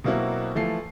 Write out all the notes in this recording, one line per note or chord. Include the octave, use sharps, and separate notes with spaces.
B2 F#3 A#3 C4 E4 F#4
E3 F3 A3 C7